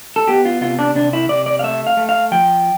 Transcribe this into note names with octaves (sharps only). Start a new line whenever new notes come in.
A4
B3 G4
F4
C3 F4
D4
C3 D4
E4
C3 D5
D5
F5
A3 E5
F5
A3
F5
F3 G5